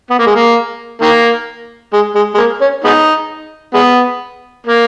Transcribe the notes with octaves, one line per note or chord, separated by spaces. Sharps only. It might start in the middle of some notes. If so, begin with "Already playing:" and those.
B3
A#3
G#3
A#3
D#3 A#3
G#3
G#3
G#3
A#3
C#4
G#3 B3 D#4
G#3 B3
A#3